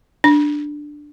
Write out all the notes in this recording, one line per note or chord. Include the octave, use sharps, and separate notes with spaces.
D4